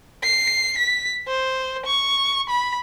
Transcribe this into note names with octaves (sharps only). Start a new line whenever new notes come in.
C7
B6
C5
C#6
B5